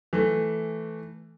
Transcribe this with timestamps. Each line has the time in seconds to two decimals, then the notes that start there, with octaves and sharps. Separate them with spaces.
0.13 E3 A3